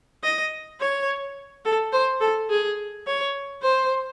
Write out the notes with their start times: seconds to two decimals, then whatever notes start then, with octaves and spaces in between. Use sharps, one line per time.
0.24 D#5
0.80 C#5
1.65 A4
1.93 C5
2.21 A4
2.50 G#4
3.06 C#5
3.62 C5